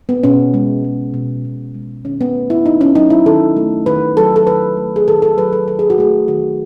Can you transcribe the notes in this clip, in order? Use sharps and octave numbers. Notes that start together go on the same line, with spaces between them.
B3
B2 C#4
G#3
G#3
B2
B2
G#3
D#3 C#4
B3
A3
E4
D#3 D#4
C#4
F#3 D#4
E4
D#3 A4
A3
D#3 B4
F#3 A4
A4
D#3 B4
A3
G#4
D#3 A4
A4
F#3 B4
A4
D#3 A4
G#4
F#4
A3 G#4
D#3 F#4